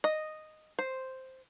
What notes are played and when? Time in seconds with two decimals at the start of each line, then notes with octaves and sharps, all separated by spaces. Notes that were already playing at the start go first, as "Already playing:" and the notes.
0.04 D#5
0.79 C5